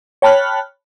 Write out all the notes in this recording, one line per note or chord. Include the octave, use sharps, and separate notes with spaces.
C#5 G5 A5 B5 F6 F#6